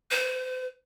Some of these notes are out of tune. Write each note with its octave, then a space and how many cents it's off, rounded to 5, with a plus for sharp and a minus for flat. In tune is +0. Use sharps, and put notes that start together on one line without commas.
C5 -40